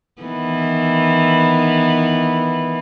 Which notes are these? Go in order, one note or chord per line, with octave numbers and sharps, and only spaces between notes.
D#3 E3 B3